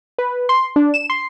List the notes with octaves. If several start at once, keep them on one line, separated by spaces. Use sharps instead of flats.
B4
C6
D4
E7
C6